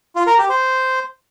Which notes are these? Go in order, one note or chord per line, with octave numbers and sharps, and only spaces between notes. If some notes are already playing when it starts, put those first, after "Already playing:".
F4
A#4
G4
C5